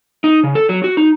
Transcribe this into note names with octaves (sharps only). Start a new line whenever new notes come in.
D#4
C#3
A4
F#3
F#4
D#4